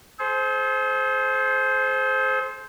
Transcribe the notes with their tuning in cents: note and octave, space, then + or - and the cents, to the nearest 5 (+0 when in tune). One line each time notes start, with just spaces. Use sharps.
G#4 +45 C5 +0